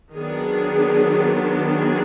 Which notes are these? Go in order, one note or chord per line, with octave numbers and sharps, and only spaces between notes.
D#3 F#3 B3 D4 G#4
G#4